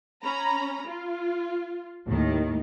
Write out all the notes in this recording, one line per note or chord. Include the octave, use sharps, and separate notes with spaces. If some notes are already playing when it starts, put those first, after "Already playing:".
C#4 A#5 B5
F4
D#2 A2 D#3